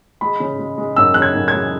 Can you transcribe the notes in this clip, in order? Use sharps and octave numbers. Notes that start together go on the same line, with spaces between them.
G#3 B5
C#3
G#3
G#3
F#2 E6
C#3 F#6
G#6
F#2
G#6
G#3